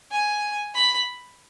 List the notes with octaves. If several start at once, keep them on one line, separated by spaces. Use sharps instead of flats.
G#5
B5